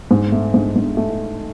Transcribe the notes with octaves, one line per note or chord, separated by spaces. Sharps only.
G#2
A3
G#2
G#2
A3